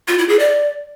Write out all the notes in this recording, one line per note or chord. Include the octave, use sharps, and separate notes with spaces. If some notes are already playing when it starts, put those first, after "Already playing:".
F4
E4
G#4
D5